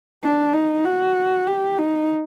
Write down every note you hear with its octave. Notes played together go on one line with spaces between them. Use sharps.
D4
D#4
F#4
G4
D#4